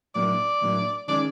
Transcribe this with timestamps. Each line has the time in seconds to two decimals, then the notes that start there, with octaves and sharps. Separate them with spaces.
0.15 A2 F#3 A#3 D4 D5
0.62 A2 F#3 A#3 D4
1.08 D#3 G#3 C#4 D5